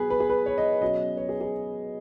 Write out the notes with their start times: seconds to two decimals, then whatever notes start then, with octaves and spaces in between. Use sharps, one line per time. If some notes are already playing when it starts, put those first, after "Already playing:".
Already playing: B2 F#3 B3 G#4 B4
0.10 B4
0.20 G#4
0.30 B4
0.46 C#5
0.58 D#5
0.82 B2 F#3 C#4 D#5
1.17 C#5
1.29 G#4
1.41 G#4